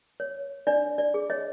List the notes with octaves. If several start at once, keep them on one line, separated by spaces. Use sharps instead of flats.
C#5
D4 D5
D5
G#4
C#5 D#5